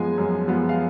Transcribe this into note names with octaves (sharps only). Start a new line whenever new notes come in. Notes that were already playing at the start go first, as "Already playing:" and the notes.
Already playing: F#2 F3 G#3 B3 G#5
F#2
F3 G#3 B3
F5